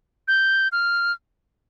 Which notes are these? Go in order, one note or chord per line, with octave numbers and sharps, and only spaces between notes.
G6
F6